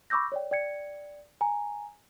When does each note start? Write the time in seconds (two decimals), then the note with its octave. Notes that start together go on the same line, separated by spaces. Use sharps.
0.10 B5 C#6 D6 E6 G6 A#6
0.32 C#5 D5 G5
0.51 D5 G5 G#6 C#7
1.41 G#5 A#5